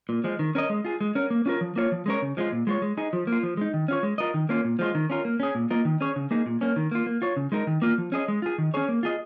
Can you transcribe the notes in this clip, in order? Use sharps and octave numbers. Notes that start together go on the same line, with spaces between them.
A#2
F3 G#3
D#3
C#4 A#4 D#5
G#3
F4 G#4
G#3
C#4 A#4
A#3
C#4 F4 A#4 C#5
F3
A#3 F4 C#5
F3
G#3 C#4 A#4 C#5
C#3
F3 G#3 F4
A#2
G#3 F4 C#5
G#3
D#4 G#4
F3
A#3
F4
F3
G#3 D#4
D#3
C#4 F4 C#5
G#3
F4 A#4 D#5
D#3
A#3 C#4 F4
A#2
F3 G#3 F4
D#3
C#4 F4 A#4
A#3
C#4 G#4
A#2
A#3 F4 A#4 D#5
D#3
C#4 G#4 C#5
C#3
A#3 D#4 G#4
A#2
A#3 C#4
D#3
A#3 F4
A#3
F4 C#5
C#3
G#3 D#4 A#4
D#3
A#3 F4
F3
C#4 G#4 D#5
G#3
F4 G#4
D#3
C#4 G#4 C#5
A#3
F4 G#4 D#5